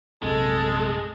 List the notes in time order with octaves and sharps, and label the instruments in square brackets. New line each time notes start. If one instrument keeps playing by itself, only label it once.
[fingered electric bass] A#1 F#2 C3 [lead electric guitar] G#3 [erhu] A4